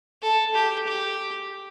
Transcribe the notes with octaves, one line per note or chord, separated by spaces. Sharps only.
A4
G4
G4